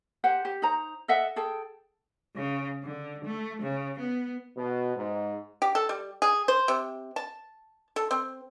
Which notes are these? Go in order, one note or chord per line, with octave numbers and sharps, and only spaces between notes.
G4 C5 F#5
G4
D#4 C5 A#5
A4 D#5 E5 F#5
G#4 A4 G5
C#3
D3
A3
C#3
B3
B2
G#2
G4
A4
G3
G#4
C5
C3
A5
A4
C4